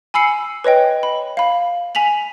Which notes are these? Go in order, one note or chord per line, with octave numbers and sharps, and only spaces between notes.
G#5 B5 E6 C7 C#7
B4 C#5 D#5 G5
B5
F5 B5
G#5 B6 F7 F#7